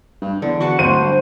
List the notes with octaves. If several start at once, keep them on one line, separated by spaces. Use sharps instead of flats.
G2
E2 D3
F#4 B4 A5 C#6
D1 C5 D#7
G2